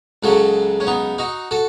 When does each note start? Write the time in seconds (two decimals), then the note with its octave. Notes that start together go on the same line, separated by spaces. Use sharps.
0.23 C#2 C#3 F#3 F#4 A4
0.80 C#4
0.87 B3 D#4
1.18 D#4 F#4
1.51 F#4 A4